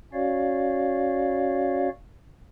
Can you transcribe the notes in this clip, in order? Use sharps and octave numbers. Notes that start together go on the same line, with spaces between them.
C#4 F#4 C#5 D5 F5